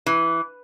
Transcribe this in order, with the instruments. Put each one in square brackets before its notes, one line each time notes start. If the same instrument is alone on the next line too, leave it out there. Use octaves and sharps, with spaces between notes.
[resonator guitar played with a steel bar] E3